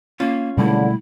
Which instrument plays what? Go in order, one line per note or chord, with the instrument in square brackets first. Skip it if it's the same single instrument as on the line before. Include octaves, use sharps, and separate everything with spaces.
[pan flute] A#3 [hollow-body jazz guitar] C#4 F4
[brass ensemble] C#2 D3 [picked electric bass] B2 G3 A3 [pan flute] E4